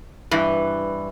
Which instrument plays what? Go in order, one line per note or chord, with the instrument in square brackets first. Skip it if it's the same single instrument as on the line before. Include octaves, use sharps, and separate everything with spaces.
[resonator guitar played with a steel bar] G2 E3